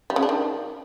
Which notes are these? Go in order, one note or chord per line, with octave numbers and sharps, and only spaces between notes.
G3
C#3
D4
D#3